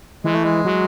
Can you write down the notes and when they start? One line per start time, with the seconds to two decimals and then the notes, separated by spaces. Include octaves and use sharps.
0.24 E3 G#3
0.33 A3
0.44 G#3
0.65 F#3